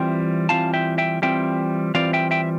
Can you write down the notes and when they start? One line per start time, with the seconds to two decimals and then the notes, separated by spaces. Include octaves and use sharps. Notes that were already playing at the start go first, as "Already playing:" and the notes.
Already playing: E3 G3 C4 F4 E5 G5
0.49 E3 G3 C4 F4 F5 A5
0.74 E5 G5
0.98 E5 G5
1.22 E3 G3 C4 F4 E5 G5
1.94 E3 G3 C4 F4 D5 F5
2.13 E5 G5
2.31 E5 G5